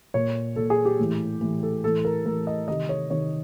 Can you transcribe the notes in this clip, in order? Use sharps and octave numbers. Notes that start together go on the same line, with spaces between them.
A#2 C#5
A#2 A4
G#4
G4
A2 E3
A2 E3
A4
A2 E3 A4
A#4
A2 E3 A#4
D#5
C3 D#3 D#5
C#5
C3 D#3 C#5